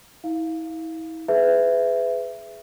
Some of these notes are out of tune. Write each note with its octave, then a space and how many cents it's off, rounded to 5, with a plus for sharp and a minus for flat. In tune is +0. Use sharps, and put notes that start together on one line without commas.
E4 -35 F5 +0
G#4 +10 B4 +30 E5 +15